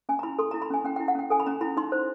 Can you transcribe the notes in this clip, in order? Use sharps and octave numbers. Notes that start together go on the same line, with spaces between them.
C#4 G#5
A#5
E4 B5
A4 C6
E4 A#5
B5
C#4 G#5
C#4 G5
G5
E4
F#5
C#4 G5
A4 G#5
B5
C#4 A#5
E4 B5
D#4 C6
C5